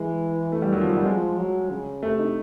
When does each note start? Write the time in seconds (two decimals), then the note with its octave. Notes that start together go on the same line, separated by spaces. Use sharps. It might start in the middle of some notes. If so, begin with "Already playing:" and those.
Already playing: E3 G#3
0.52 A3
0.62 G3
0.73 D#3 F#3
0.81 F3
0.90 F#3
0.97 G3
1.06 F3 G#3
1.38 F#3
1.70 C#3
2.03 C3 A3
2.19 D#4